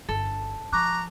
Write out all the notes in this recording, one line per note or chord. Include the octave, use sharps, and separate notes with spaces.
G1 A4
F3 A#5 C#6 D6 F#6